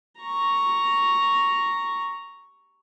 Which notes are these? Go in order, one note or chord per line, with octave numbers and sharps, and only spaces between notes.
A#5 C#6